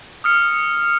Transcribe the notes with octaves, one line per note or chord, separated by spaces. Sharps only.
D#6 F6 C#7